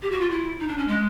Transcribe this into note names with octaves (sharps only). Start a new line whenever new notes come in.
G4
F#4
F4
E4
D#4
D4
C#4
G#3